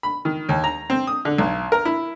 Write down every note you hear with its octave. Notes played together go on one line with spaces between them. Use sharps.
B5
D#3
D#2
A#5
C4
D#6
D3
B1
A#4
E4